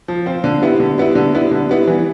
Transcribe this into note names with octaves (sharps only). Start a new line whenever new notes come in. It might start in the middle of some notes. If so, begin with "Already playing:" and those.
F3
C4 F4 C5
D3
G3 B3 E4
D3
G3 B3 E4
D3
G3 B3 E4
D3
G3 B3 E4
E3